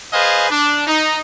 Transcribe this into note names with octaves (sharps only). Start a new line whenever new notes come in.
G#4 B4 C5 D#5 F5 G#5
D4
D#4